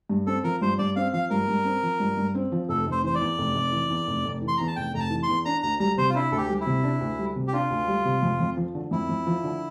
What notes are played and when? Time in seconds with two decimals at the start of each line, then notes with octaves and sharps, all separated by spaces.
0.09 G2
0.27 C4 A4
0.44 F3 A#4
0.61 G2 C5
0.78 G2 D5
0.96 C4 F5
1.13 F3 F5
1.30 G2 A#4
1.48 G2
1.65 C4
1.83 F3
2.00 G2
2.17 G2
2.35 C4
2.52 F3
2.69 F1 A4
2.87 F1 C5
3.04 E3 C5
3.15 D5
3.21 E2
3.38 F1
3.55 F1
3.72 E3
3.90 E2
4.07 F1
4.25 F1
4.42 E3
4.48 C6
4.57 E2 A#5
4.67 A5
4.76 F1 G5
4.94 F1 A#5
5.00 A5
5.10 E3
5.23 C6
5.28 E2
5.45 D4 A#5
5.63 D2 A#5
5.80 G3 A#5
5.98 C3 C5
6.10 F4
6.15 D4 E4
6.32 D2 A4
6.37 G4
6.49 G3
6.61 E4
6.66 C3
6.84 D4
7.01 D2
7.19 G3
7.36 C3
7.48 G4
7.53 D4 F4
7.70 D2
7.88 G3
8.05 C3
8.23 F2
8.40 F2
8.57 F3
8.75 D3
8.91 F2 E4
9.09 F2
9.27 F3
9.44 D3